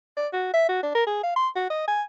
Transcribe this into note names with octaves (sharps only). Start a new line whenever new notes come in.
D5
F#4
E5
F#4
D4
A#4
G#4
F5
C6
F#4
D#5
G#5